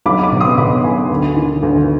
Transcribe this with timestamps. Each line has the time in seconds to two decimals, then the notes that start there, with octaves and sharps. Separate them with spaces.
0.06 B1 B5 D6
0.23 B5 D6
0.32 B2
0.40 C6 D#6
0.58 B2 B5 D6
0.84 B1 G#5 C6
1.10 D2
1.37 D#3
1.63 D2